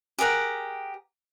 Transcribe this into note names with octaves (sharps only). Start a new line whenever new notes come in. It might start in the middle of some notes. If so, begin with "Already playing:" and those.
G4 G#4 A#4 F#5